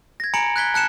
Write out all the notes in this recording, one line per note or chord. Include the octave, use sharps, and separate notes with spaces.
G#6 A#6
G#5 A#5 B5 C#7 D7 F#7
F#6 G#6 B6 G7
A5 F#6 C#7 E7